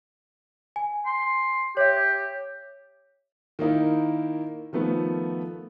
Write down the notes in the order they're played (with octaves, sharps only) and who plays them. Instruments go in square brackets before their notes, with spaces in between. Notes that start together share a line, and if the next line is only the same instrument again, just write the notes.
[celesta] G#5
[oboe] C6
[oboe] G4 [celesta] C#5 E5
[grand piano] D#3 A#3 D#4 E4
D#3 F3 A3 B3